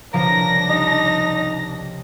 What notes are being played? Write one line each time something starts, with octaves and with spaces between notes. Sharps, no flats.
C2 C#3 F3 D4 A#4 A#6
D#4 G4